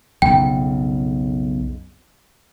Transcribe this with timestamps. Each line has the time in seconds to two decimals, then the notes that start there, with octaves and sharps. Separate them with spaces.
0.22 B1 F2 C#3 G5